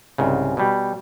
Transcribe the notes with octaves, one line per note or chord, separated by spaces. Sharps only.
C2 G#2 C#3
B2 G3